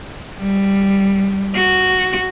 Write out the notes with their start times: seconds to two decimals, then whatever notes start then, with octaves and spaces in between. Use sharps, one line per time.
0.38 G3
1.55 F#4